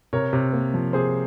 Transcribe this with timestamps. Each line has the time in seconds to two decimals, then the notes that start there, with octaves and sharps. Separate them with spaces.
0.13 C3 A#4 C#5
0.33 C3
0.53 A#3
0.74 F3
0.93 C3 G#4 C5